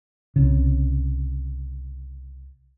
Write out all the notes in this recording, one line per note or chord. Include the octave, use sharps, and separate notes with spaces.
C2 C#3